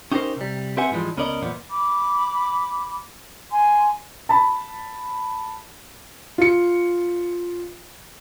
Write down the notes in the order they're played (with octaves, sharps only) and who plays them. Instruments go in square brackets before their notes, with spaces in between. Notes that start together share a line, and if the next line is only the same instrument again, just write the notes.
[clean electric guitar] C#4 D#4 G4 G#4 A#4 C5
C3 G3
C4 G4 B4 E5 F#5 G#5
G#2 E3 F3 G3 G#3
C#2 B3 C#4 A#4 D5 D#5
B1 E2 A#2 F3 B3
[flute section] B5 D6
G#5 C6
[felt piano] A5 B5
F4 C#7